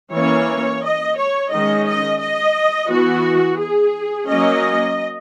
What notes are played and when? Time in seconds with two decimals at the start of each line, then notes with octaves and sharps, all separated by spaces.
0.13 E3 A#3 C#4 C#5
0.83 D#5
1.17 C#5
1.51 D#3 G#3 C#4 D#5
1.86 D#5
2.20 D#5
2.89 E3 B3 F#4
3.59 G#4
4.28 F#3 A#3 C#4 D#5